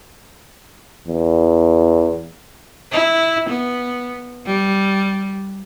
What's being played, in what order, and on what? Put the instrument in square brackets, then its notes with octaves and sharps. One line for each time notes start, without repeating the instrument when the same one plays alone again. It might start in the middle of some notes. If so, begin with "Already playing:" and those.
[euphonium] E2
[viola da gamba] E4
B3
G3